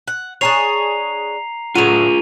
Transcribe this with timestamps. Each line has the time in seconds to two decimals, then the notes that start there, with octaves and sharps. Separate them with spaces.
0.08 F#5
0.41 D4 G#4 C#5 A#5 C7 F7
1.75 A2 F#3 F4 G#4 D#7 F7